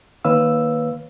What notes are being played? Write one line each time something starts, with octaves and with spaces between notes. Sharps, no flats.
D#3 A#3 B4 C#5 F5 E6